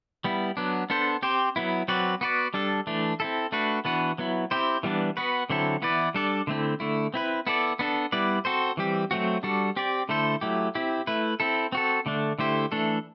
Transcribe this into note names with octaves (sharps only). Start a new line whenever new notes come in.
G3 B3 E4
F#3 B3 D4
B3 D4 A4 C5
C4 G4 C5
F#3 B3 E4
F#3 C4 F#4 B4 D5
B3 F#4 B4 D5
G3 D4 A4
E3 A3 D4
C4 E4 A4
A3 D4 F#4 B4
E3 B3 D4 F#4 B4
F#3 B3 E4
C4 E4 G4 C5
E3 G3 B3 D4
B3 F#4 B4
D3 F#3 C4 E4 A4
E3 B3 E4 B4 D5
G3 D4 A4 D5
D3 A3 C4 E4
D3 A3 E4
C4 E4 B4
B3 E4 A4 D5
B3 D4 A4
G3 B3 E4 B4 D5
C4 F#4 A4 C5
E3 G3 C4 G4
F#3 A3 C4 F#4
G3 D4 F#4 A4
C4 G4 D5
D3 A3 E4 A4 C5
F#3 A3 E4 G4
C4 E4 G4
A3 E4 B4
C4 E4 A4
C4 F#4 A4
D3 A3 D4
D3 A3 E4 G4 C5
E3 A3 D4 A4